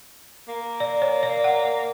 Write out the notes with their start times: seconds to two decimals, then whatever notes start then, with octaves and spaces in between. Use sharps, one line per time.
0.49 A#3
0.80 D5
1.02 C#5
1.23 D5
1.44 F#5